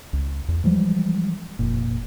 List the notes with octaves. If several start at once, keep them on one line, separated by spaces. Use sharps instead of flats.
C#2
E2
E3 F3 G3 G#3
F1 A#2